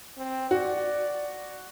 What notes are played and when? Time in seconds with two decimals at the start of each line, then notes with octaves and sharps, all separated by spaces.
0.18 C4
0.51 F#4 D5